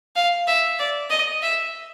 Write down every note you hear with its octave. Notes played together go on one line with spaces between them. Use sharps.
F5
E5
D5
D#5
E5